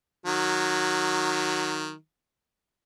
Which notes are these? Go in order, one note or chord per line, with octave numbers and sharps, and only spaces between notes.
D#3 F#3